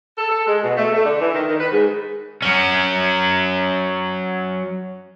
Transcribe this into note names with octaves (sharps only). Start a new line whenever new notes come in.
A4
A4
G#3
B2
A3
A3
D3
E3
D#3
D#3
B4
G#2
F#3 C#4